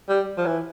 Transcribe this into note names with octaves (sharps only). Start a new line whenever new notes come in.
G3
F3
E3